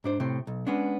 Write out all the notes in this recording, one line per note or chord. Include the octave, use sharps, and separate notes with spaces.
G#2 D4 C5
A2 C3 C4
B1
G#3 B3 C#4 D4